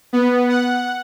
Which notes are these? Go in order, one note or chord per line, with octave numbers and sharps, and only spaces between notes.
B3
F#5